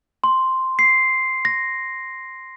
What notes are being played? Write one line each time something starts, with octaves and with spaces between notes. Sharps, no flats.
C6
C7
A#6